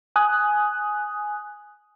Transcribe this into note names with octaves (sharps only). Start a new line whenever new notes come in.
G#5 D#6 F#6